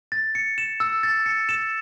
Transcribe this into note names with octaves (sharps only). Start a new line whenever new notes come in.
A6
C#7
E7
E6
A6
C#7
E7